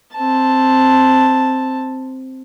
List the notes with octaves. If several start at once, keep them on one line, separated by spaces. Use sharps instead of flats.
C4 A5